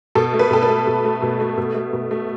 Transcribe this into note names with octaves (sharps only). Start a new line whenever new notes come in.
B2 A4
A3
B4
B2 A4
B4
A3
B2
A3
B2
A3
B2
A3
B2
A3